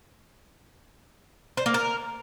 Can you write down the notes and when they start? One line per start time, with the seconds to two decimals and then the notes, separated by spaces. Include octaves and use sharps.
1.57 C5
1.66 A#3
1.74 A#4